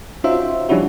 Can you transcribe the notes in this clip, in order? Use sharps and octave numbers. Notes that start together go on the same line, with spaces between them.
C#4 D#4 F4 F#4 C5 E5
F3 G3 C#4 D4 E4 F#4